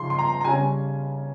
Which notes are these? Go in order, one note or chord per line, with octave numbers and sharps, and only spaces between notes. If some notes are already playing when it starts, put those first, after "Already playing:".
Already playing: C#3 F3 D#4 C6
C6
A#5
A#5
C#3 G3 C#4 G#5